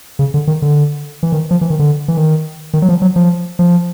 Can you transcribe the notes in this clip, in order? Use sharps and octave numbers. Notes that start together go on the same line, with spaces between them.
C#3
D3
D#3
D3
E3
D#3
F3
E3
D#3
D3
E3
D#3
D#3
F#3
F3
F#3
F3
F3